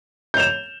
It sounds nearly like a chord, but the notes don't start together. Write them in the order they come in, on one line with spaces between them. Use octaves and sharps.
G6 F7 E7